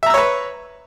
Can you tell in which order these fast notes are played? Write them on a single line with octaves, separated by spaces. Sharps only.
E5 A#5 E6 C#5 B4